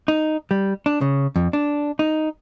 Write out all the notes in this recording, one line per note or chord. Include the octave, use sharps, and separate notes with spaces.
D#4
G3
D4
C#3
F2
D4
D#4